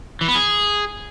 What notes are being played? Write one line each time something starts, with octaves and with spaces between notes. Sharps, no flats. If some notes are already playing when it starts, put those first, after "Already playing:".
E3
B3
G#4